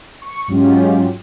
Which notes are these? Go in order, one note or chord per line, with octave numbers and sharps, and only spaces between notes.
C#6
G#2 F#3 G#3 C#4 F4 G4